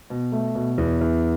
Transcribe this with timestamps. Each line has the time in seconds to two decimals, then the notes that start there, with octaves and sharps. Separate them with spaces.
0.10 B2
0.32 A3
0.55 B2
0.78 E2
1.01 E2